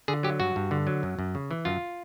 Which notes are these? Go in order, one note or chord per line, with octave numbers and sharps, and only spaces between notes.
D3 G#4
F#3 G4
G2 F#4
G2
D3
F#3
F#2
F#2
C#3
E3
F#2 F4